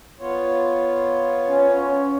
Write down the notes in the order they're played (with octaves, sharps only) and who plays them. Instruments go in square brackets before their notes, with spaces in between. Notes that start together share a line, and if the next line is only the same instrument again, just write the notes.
[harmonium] B3 F4 C#5
[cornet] C#4